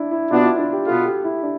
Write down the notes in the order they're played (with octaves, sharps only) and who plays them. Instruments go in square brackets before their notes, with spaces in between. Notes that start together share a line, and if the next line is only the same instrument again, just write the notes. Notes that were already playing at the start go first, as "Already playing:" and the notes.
Already playing: [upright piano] D4 E4
E4
[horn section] B2 B3 D4 [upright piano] F4
[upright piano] E4
D4
G4
[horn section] B2 B3 F4 [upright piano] A4
[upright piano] G4
E4
D4